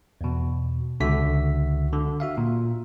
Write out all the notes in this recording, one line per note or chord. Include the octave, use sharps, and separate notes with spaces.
E2 B2
C#2 D3 F#4 E5 B6
D3
F#4 E5 F5
A#2